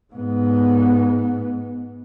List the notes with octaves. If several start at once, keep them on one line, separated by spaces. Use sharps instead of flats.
G#2 B3